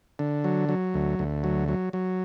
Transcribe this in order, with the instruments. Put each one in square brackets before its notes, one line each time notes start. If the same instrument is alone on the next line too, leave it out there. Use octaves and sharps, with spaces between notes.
[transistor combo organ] D3
F#3
F#3
D2
D2
F#3
F#3
F#3